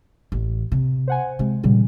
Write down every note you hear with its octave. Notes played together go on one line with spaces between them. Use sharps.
A1
C3
C5 F#5 G#5
C3 G#3
A#2 C#3 E3 G3